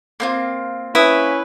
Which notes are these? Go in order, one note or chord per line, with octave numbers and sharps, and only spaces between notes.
A#3 C4 F4
C#4 E4 B4 D#6